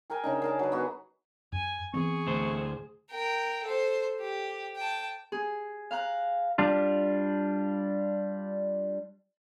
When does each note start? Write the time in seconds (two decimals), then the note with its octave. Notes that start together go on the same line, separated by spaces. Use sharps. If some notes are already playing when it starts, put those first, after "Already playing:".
0.10 G#4 A#4 G5 G#5
0.24 C#3 D4 D#4
0.42 G#4 A#4 A5
0.59 F#3 B4
0.72 B3 F#4
1.52 F#2 G#5
1.94 E3 B3 C4 G#4 C#6
2.27 D2 A2 C5
3.11 A#4 G5
3.63 A4 C5
4.20 G4
4.76 G5 A5
5.32 G#4
5.91 F5 A#5 F#6
6.58 G3 D4 F4